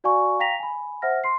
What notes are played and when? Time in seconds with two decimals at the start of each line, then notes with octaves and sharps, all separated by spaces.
0.04 F#4 D5 F5 G#5 A#5 C#6
0.39 F5 G5 A#5 A#6 B6 F7
0.59 G#5 B5
1.02 C5 E5 F#5 F6 A#6
1.24 C6 C7